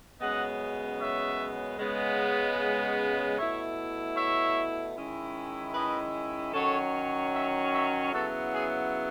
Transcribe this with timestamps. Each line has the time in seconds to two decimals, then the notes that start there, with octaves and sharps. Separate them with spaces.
0.20 F#2 C#3 G#3 B3 D#5 F#5
1.00 C#5 E5
1.79 C#3 G#3 B3
3.37 B2 A3 E4 C#5 E5
4.16 C#5 E5
4.96 D#3 G#3 C#4 E4
5.75 B4 D#5
6.53 D#3 F#3 C#4 A4 C#5
7.33 C#5 E5
7.72 C#5 E5
8.12 C#3 F#3 B3 E4 F#4 A4
8.52 G#4